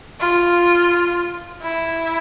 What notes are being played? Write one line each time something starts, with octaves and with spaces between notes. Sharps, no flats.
F4
E4